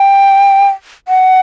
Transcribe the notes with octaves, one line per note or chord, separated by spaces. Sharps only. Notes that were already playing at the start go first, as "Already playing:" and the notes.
Already playing: G5
F#5